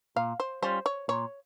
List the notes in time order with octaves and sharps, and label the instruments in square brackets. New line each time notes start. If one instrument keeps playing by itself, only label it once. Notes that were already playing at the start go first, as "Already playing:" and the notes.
[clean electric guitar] A#2 [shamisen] F5
[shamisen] C5
[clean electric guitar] G3 C#4 F4 [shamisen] C5
[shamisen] C#5
[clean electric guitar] A#2 [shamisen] C#5